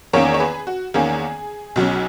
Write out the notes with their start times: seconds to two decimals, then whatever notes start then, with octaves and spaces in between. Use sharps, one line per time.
0.13 E2 D#3 A#3 C#4 A#4 C#5
0.34 C#5
0.40 G#4 B4
0.67 F#4
0.94 E2 D#3 A#3 C#4 G#4
1.76 B1 B2 F#3 C#4